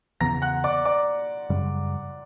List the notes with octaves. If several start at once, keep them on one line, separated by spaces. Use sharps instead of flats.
E2 C#3 E3 B3 A#5 A#6
F#5 F#6
D5 D6
D5 D6
F#2 C#3 G3